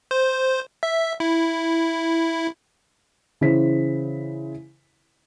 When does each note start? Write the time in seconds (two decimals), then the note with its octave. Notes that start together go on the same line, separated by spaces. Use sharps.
0.11 C5
0.83 E5
1.20 E4
3.41 C#3 E3 E4 C5 B6